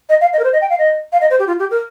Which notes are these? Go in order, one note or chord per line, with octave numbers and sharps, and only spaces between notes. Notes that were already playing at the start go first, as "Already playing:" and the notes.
D#5
F5
D#5
A#4
C5
D#5
G5
F5
D#5
F5
D#5
C5
G4
F4
G4
A#4